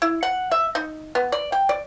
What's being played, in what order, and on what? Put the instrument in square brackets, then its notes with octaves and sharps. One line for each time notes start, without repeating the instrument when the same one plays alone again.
[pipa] E4
F#5
E5
D#4
B3
D5
G5
D5